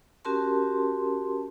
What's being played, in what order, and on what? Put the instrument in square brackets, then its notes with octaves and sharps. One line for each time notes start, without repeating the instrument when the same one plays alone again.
[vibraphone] C#4 F#4 G4 A#4 A5 C6